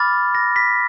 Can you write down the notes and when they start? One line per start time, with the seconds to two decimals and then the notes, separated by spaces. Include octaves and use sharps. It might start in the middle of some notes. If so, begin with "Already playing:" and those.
Already playing: B5 D6 F6 A6
0.35 A#6
0.56 B6